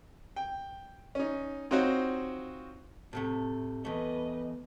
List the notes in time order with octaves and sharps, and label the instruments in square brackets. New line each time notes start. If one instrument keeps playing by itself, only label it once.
[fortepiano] G5
C#4 D#4
C4 D#4 F4 F#4 C5 C#5
[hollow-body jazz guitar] A2 C3 A3
[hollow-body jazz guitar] E2 A3 [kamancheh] B4 D#5